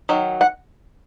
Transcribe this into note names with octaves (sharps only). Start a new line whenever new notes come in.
D#3 F#3
F#5